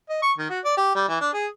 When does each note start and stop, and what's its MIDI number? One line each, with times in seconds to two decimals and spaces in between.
0.09 0.19 75
0.22 0.32 85
0.38 0.49 51
0.50 0.60 66
0.65 0.73 74
0.77 0.91 67
0.95 1.06 55
1.08 1.18 52
1.21 1.29 62
1.33 1.47 68